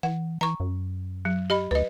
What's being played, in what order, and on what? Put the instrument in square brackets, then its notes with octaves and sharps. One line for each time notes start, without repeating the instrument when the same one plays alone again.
[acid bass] E3 [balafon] F#5
[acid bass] E3 [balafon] A#5 C#6
[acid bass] F#2
[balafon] F#3
G4 D#5 B5
[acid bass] D2 [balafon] B4 D#5